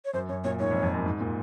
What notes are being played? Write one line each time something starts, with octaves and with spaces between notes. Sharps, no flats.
C#5
F#2 C5
F#2 C#5
A#2 C#5
G#2 C#5
F2
F2
F#2
G#2
A#2